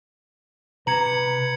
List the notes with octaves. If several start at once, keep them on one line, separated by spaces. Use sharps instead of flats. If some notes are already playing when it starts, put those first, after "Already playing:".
C3 B4 A#5 G#6 C#7 F#7